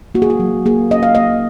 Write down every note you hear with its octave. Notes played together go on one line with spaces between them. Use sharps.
A#3 F#4
G#4
F#4
F#3
A#3 G#4
C#4 D#5
F5
A#3 D#5